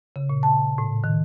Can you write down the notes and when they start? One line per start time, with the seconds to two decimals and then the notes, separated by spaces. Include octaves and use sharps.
0.16 C#3
0.30 A#2
0.43 A5
0.78 A2
1.04 D#3